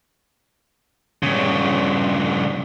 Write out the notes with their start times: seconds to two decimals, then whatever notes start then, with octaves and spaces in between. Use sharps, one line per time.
1.23 G2 C#3